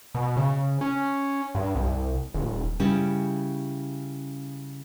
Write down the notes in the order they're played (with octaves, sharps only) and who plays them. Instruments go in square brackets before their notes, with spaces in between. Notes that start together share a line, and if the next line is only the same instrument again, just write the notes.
[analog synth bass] B2
C#3
C#4
G2
C2
D#1
[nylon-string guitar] C#3 G3 C#4 E4